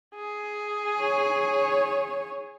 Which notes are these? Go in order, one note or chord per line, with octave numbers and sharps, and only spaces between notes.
G#4
C#5